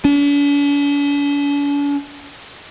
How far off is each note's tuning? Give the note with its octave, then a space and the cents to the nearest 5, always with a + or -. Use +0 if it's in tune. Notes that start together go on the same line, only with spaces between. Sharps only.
D4 -45